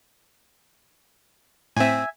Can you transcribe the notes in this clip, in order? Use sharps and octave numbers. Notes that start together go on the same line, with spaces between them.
A2 C4 E5 G#5